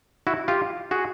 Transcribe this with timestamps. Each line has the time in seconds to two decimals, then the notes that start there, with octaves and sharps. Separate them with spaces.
0.27 E4 F#4
0.48 F4 G4
0.91 F#4 G#4